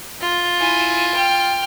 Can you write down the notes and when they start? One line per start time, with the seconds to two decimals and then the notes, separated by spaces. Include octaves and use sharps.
0.21 F4
0.59 E4 G#5
1.15 G5 F6